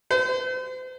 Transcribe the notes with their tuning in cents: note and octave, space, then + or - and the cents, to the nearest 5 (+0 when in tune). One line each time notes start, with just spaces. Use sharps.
C5 -40